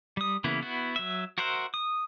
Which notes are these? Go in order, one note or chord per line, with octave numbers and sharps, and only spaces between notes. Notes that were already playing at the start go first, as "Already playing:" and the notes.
G3 D#6
C#3 E3 A#3 B3 E4
B3 E4 F#4
F#3 E5
F#4 A#4 C5 E5 F#5
D#6